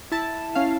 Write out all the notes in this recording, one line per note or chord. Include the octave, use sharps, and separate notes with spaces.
E4 A5
C#4 F5